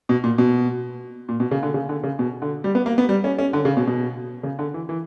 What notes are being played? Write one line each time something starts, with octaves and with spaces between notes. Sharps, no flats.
B2
A#2
B2
A#2
B2
C#3
D3
C#3
D3
C#3
B2
D3
G3
B3
A#3
B3
G3
C#4
C#4
D3
C#3
B2
B2
C#3
D3
E3
E3